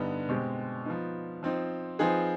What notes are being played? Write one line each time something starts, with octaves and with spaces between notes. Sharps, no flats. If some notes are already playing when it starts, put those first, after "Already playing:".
Already playing: G2 D3 G3 B3 D#4
B2 G#3 C4 G4
F3 B3 D#4
F3 C4 D#4
F3 C4 D#4 G#4 B4